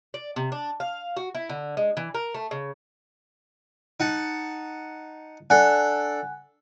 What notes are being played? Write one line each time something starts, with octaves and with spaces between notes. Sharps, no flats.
D5
C3
D4
F5
F#4
E4
D3
G#3
E3
A#4
A3
C#3
D#4 F#5 A5
D4 A4 F#5 G#5 F#6